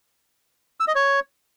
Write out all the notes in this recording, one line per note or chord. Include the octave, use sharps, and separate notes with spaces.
E6
D#5
C#5